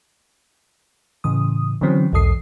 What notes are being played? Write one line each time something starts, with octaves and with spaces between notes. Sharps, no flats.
A2 C#3 E3 D#6
D3 E3 F#3 C4 C#4
B1 E2 G#2 A4 D#6 C7